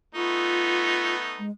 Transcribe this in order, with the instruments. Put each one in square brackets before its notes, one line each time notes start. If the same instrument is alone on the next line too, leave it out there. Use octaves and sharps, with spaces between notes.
[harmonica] A3 B3 D#4 [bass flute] F4
[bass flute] G#3